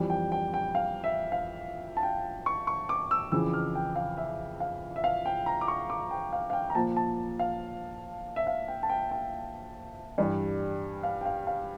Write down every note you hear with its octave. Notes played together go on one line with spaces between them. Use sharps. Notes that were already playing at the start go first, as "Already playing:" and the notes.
Already playing: F2 E3 G3
G5
G5
G5
F5
E5
F5
A5
G5
C#6
C#6
D6
E6
F2 C#3 E3 E6
F6
G5
F5
E5
F5
E5
F5
G5
A#5
D6
C#6
D6
G5
F5
F5
G5
A#5
A#2 F3 A5
A5
F5
E5
F5
G5
A5
G5
G5
G2 E3 G3
F5
G5
F5
F5